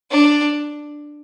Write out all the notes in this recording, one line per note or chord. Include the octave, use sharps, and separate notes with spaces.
D4